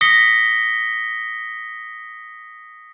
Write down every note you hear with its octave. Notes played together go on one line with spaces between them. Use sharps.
D#6 A#6 B6 C#7 G7